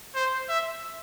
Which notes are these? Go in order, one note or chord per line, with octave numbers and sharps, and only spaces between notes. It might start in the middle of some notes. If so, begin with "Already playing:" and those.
C5
E5